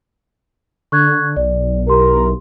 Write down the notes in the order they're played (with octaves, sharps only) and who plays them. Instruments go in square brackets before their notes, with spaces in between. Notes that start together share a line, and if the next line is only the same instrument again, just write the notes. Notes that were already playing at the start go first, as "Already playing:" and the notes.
[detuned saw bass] D3 [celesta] C#6 F#6 G#6
[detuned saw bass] B1 [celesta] D5
[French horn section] E4 A#4 [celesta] G4 C6